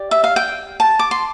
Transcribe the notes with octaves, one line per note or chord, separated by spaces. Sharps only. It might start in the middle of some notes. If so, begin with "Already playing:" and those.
Already playing: G4 D5
E5
F5
G5
A5
D6
C6